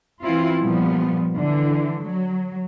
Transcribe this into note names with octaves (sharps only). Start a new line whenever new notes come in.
E3 C4 E4 F4
A#2 F3 G3 B3
D3 E3
F#3